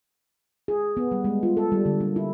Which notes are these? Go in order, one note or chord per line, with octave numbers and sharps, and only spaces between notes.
G#4
B3
G3
G#3
F4
A4
G3
D3
A#3
E4